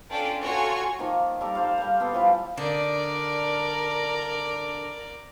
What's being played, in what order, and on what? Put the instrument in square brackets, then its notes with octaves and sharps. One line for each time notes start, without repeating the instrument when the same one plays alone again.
[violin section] C#4 D4 F4 A4 D5 G5
F4 F#4 A4 C#5 G#5 C#6
[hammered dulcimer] D#3 F3 A#3 A#4
G3 A4 A#5 D6
A4 C5 F5
G3 A#3
B3 A4 F5
E3 F3 G3 B5
[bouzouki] D3 D4 D#4 [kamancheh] A#4 D5